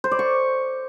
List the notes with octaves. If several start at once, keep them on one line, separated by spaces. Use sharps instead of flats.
C5
D5
C#6